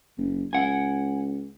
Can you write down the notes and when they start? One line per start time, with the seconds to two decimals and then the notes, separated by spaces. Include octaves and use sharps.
0.18 F#1
0.53 C#2 F#5 G#5